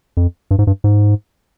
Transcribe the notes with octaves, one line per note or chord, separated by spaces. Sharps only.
F2
G2
G#2
G2
G#2